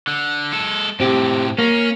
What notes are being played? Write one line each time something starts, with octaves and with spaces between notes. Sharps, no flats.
D3
G#3 A4
A2 C3 C4 G4
A#3 C#4